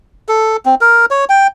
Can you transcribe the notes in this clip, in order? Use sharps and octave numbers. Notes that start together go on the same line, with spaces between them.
A4
C4
A#4
C#5
G5